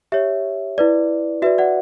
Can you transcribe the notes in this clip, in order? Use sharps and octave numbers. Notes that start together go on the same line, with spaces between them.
G4 C#5 E5
E4 B4 D5
F#4 B4 D5 E5
D5 F#5